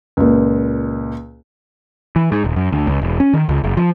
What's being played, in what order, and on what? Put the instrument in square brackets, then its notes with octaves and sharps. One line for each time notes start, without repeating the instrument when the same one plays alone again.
[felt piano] C#2 A#2
[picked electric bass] E3
G#2
D#1
F#2
D2
C#2
E1
C#4
D#3
C#2
F#1
F3